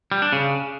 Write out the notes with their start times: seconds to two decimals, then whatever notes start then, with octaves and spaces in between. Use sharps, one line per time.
0.12 G3
0.22 D4
0.33 C#3